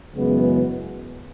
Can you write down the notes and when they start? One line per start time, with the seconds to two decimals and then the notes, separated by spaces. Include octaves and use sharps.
0.16 F#2 C#3 E3 G#3 B3